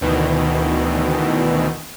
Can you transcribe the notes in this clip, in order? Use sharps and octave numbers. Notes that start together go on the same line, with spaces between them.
D2 B2 D#3 E3